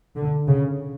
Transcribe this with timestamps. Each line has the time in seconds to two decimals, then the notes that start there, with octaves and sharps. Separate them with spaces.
0.16 D3
0.48 C#3